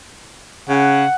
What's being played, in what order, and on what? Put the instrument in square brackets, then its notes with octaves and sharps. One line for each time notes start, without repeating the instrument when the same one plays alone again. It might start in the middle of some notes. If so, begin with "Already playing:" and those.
[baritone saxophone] C#3 [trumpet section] F#5